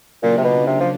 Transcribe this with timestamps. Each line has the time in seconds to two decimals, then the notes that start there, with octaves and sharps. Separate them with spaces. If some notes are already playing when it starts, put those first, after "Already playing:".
0.22 A#2 C#3 F#3 A#3 D4 F4
0.37 C3
0.44 B2
0.67 C3
0.80 F3